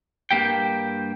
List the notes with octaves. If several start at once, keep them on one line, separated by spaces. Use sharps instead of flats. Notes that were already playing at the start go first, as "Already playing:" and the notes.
G2 A#3 G4 G5